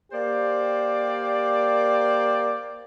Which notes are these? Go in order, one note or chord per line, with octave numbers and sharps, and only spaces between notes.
A#3 G4 C5 D5